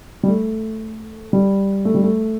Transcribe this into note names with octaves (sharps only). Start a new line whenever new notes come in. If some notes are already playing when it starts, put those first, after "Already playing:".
G3
A3
G3
A3
G3
A3